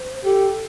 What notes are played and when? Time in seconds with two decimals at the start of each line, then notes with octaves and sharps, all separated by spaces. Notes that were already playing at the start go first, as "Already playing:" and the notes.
Already playing: C5
0.24 G4 A4